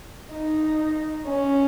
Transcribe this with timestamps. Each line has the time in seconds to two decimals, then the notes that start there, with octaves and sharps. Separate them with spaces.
0.33 D#4
1.26 C#4